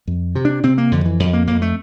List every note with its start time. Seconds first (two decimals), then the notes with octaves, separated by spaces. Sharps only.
0.08 F2
0.35 C3
0.45 D4
0.63 C3 C4
0.78 A#3
0.92 F2 D3
1.05 E3
1.20 F2
1.33 A#3
1.47 F2 A#3
1.62 A3